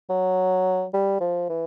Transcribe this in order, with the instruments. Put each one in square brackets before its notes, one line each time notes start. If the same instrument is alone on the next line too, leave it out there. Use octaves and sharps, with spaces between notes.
[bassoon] F#3
G3
F3
E3